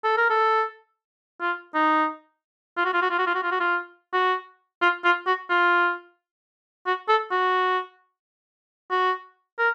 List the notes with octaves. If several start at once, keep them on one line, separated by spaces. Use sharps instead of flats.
A4
A#4
A4
F4
D#4
F4
F#4
F4
F#4
F4
F#4
F4
F#4
F4
F#4
F4
F#4
F4
F4
F#4
F4
F#4
A4
F#4
F#4
A#4